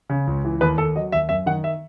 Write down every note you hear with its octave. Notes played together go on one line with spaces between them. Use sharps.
C#3
C#2
E3
D#2 B4
D#2 A4
F#3 D#5
D#2 E5
F#2 E5
D#3 F#5
E5